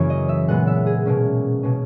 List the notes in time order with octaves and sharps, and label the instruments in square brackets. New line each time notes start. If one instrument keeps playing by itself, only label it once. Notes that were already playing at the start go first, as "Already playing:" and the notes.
Already playing: [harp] F#2 C#3 E3 A#3 C#5
D#5
E5
A#2 G#3 B3 F#5
E5
G#4
B2 A#3 C#4
B2 A#3 C#4